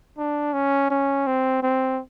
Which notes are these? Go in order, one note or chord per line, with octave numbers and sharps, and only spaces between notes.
D4
C#4
C#4
C4
C4